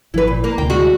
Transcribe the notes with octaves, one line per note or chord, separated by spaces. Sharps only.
G#1 F3 E4 B4
A#2
A#3
D2 C3 G5
G3 G#3 F#4